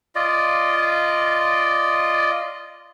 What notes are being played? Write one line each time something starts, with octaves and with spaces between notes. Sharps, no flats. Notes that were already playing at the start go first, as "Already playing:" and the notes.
F4 D5 D#5